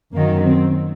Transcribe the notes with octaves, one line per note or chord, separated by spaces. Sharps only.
F#2 D#3 F#3 A#3
C4